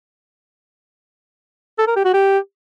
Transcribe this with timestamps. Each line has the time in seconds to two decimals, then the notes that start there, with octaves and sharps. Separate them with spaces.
1.78 A4
1.87 A#4
1.96 G4
2.05 F#4
2.14 G4